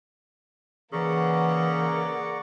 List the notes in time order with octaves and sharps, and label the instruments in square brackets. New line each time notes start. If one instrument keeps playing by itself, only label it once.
[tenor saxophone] C#3 [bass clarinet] E3 [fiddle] A#3 F#5 [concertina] D5 A#5 C#6